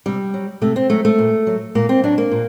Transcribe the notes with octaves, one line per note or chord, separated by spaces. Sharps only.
C3 G3
F#3
C3 A3
C4
F#3 A3
A3
A#2
F#3
A#2 A#3
C4
F#3 D4
A#3
A#2